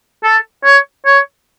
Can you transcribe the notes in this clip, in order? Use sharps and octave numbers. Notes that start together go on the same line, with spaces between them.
A4
C#5
C#5